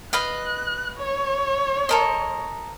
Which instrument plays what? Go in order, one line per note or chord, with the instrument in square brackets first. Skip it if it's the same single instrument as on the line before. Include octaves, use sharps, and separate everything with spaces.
[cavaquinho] B4 D#5 F5 [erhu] F#6
[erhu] C#5
[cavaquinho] A4 A#4 D#5